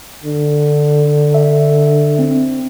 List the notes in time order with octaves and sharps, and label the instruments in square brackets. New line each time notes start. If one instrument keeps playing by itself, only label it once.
[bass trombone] D3
[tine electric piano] E5
C4